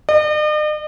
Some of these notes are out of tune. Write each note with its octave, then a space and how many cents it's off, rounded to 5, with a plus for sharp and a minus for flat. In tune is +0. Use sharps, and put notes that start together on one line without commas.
D#5 -45